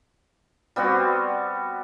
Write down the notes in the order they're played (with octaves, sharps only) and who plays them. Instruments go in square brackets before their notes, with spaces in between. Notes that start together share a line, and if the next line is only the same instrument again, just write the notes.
[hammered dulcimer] G3 B3 C4 F#4